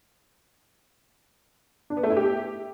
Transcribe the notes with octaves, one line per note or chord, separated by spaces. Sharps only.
D4
B3
A3
E4
G4